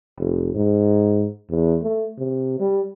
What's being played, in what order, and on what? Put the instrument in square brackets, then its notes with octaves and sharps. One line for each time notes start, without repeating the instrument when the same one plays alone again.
[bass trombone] F1
G#2
E2
A3
C3
G3